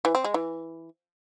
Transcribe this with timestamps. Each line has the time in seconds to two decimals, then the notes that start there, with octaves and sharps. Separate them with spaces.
0.05 E3
0.15 C4
0.24 G#3
0.34 E3